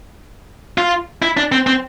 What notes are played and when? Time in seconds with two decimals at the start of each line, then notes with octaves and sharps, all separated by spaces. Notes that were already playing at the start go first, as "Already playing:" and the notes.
0.78 F4
1.22 E4
1.37 D4
1.52 C4
1.67 C4